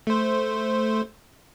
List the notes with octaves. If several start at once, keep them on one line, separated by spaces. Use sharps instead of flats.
A3 C5